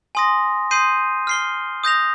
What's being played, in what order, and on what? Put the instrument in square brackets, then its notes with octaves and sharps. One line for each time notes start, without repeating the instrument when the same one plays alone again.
[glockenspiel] G#5 C6 D#6 A#6
C6 D#6 G6 C7 D#7
F6 C7 G7
D#6 G6 A#6 F7